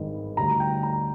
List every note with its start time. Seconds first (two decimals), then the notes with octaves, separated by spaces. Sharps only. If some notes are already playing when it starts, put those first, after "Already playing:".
Already playing: G#1 G2 D#3 G#3
0.37 D2 D3 G3 A#5
0.60 G5
0.83 A#5